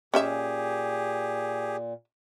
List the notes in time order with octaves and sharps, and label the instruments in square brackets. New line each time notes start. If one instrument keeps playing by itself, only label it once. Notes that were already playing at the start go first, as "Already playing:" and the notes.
[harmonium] A#2 [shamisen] C#4 D#5 E5 [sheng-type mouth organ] G4 G#4